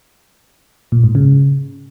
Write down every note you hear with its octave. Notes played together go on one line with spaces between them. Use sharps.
A#2
G#2
C#3